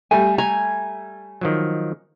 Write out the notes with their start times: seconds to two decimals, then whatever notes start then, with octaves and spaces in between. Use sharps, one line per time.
0.11 G3 A3 G#5
0.38 G#5 A#5
1.41 D#3 F3 F#3